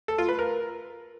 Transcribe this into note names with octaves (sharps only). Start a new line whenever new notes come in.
A4
F4
B4
A#4